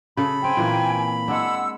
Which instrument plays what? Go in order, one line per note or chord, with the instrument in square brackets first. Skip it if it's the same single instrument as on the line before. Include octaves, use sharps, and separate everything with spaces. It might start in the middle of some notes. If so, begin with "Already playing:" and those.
[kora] C#3 A4 [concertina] B5
[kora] C4 E5 [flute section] G5 G#5
[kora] A#2 E3 A#3
[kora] G#3 D4 [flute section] F#5 E6